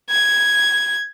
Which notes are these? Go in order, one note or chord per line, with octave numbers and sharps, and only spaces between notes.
G#6